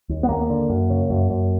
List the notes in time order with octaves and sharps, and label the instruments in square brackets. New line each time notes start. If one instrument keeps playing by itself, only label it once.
[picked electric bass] D#2
B3
D#2 A#3
D3
F#2
C#3
F#2
F#2